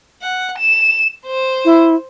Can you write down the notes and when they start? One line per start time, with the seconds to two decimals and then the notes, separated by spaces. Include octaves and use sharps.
0.21 F#5
0.58 E7
1.26 C5
1.65 E4